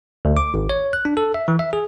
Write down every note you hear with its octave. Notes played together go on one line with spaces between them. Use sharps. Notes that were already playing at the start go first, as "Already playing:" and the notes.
D2
D6
G#1
C#5
F#6
D4
A4
E5
E3
E5
G#4